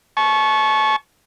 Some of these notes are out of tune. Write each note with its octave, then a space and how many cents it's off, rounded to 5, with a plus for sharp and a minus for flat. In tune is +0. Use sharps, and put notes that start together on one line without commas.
A5 -35 C#6 -10